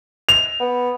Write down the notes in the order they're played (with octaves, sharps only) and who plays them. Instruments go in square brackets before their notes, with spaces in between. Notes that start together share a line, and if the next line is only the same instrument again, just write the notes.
[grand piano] F7
[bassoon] B3